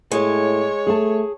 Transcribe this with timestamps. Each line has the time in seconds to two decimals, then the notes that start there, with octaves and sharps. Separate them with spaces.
0.11 A2 G#3 C#5
0.87 A3 G#4 A5